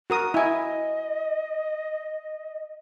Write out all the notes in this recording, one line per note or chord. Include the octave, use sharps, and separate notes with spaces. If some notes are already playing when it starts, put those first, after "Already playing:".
F#4 A#4 D#6
E4 D#5 G#5